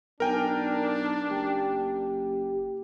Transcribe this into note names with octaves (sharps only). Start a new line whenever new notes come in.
B1 D4 A#4 G5 G#5
F#1 G4